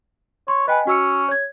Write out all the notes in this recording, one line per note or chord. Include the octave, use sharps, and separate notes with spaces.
C#5 C6
B4 D#5 G5 G#5
C#4 F#4 E6 C#7
C#5 G#6